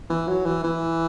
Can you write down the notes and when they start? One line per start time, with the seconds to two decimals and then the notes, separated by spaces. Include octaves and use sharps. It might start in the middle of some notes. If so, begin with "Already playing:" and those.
0.10 E3
0.27 F#3
0.45 E3
0.64 E3